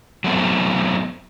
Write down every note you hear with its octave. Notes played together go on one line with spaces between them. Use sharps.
F#3 A3 B3 C4